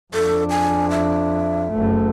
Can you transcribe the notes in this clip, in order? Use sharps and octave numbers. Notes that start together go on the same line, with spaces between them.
F2 D4 A4
G#5
E5
F#1 A3